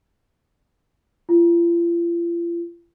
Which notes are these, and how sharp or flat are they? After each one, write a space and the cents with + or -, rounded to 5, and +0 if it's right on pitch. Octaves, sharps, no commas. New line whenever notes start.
F4 -40